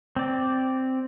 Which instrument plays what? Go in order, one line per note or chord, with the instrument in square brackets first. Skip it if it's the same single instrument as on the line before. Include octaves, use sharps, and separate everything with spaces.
[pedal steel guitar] C4 D5